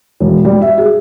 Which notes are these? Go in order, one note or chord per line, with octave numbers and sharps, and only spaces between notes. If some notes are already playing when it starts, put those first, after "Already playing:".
E1
G3
E5
G#4